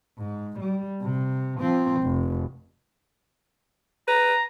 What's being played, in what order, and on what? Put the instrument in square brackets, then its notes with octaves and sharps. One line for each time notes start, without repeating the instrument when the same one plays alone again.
[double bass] G#2
G3
C3
F3 C4
F1
[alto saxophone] B4 [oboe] A#5